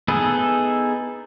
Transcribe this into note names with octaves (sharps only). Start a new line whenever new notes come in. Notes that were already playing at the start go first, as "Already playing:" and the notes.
B3 D#4 E4 G#4 A4